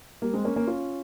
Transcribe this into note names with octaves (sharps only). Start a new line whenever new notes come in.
G3 A#3
G#3 C4
A#3 C#4
A#3 C#4
C#4 F4